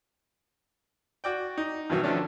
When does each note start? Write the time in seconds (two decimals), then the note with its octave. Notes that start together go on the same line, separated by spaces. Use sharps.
1.24 F#4 D5 G5
1.58 D#4
1.90 G2 B2 D#3 E3 F#3
2.03 D3 D#3 F3 A3 C#4 D4